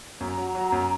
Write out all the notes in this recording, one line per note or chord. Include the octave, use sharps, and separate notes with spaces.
F#2 A#5
F#3
F#3
F#2